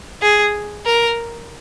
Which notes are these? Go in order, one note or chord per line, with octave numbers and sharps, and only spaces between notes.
G#4
A#4